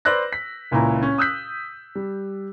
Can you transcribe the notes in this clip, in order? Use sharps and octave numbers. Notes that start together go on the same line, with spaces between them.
B4 C5 D5 E6 F#6 A#6
B6
C#2 A#2 C#4 E4 A#5
C#4
D#6 E6 F#6 G6 B6
G3